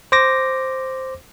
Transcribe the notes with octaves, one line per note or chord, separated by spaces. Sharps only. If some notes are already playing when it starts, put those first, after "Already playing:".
C5 D6 A#6